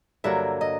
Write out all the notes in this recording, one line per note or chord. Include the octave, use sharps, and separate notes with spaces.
G2 D3 F#3 A#3 E5
D#5